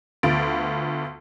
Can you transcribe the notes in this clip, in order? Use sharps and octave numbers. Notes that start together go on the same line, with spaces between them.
D2 B3 F4 A6 D7